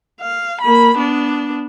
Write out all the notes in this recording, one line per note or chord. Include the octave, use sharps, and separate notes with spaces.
F5
A#3 B5
B3 D4